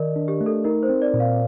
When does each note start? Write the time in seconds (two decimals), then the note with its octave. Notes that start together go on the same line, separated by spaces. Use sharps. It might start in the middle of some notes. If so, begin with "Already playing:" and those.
Already playing: D#3 A#4 D5 D#5
0.16 D4
0.28 G4
0.41 A3
0.46 A4
0.64 D#4 A#4
0.83 C5
0.89 C4
1.02 D5
1.14 A#2
1.20 F5